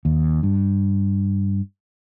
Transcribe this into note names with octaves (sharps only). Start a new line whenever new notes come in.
D#2
G2